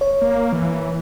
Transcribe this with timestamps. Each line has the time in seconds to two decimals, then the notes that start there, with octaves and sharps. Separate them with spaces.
0.01 C#5
0.21 A#3
0.53 E3